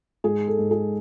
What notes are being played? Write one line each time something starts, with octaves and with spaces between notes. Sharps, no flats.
G#2 G#4
A4
G#2
G#4